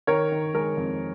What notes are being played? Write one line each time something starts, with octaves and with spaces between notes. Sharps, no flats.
D#3 A#4 C#5
D#3
G#3 A#4
F2